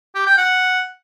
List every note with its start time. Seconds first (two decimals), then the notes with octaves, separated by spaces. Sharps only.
0.15 G4
0.26 G5
0.37 F#5